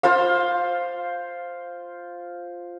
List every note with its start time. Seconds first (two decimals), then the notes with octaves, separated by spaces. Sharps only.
0.03 F4 C5 F5